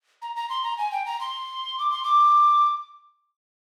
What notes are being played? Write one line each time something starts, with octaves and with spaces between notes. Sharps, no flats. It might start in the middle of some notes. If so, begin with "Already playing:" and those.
A#5
A#5
C6
A#5
G#5
G5
A#5
C6
D6
C6
D6